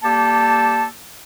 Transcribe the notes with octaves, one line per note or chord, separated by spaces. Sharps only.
G3 A#3 G4 A4 A5